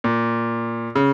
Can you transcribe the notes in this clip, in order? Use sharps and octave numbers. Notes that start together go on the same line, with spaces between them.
A#2
C#3